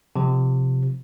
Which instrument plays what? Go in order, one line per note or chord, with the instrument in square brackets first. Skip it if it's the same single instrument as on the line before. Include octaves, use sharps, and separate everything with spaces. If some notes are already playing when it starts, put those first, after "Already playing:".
[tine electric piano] C3 F3